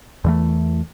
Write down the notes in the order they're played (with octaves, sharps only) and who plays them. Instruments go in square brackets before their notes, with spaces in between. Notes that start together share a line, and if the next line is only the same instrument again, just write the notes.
[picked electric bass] E2 E3 A3